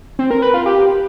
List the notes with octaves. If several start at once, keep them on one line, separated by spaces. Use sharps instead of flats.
C4
A#4
B4
F4
G4